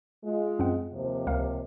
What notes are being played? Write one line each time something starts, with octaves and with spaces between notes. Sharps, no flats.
G#3 F4
F#2 C4 F#5
D#2 C3 F3
C#2 A#4 F5